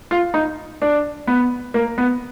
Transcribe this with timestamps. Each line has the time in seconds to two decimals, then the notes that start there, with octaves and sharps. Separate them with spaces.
0.11 F4
0.34 D#4
0.82 D4
1.27 B3
1.74 A#3
1.98 B3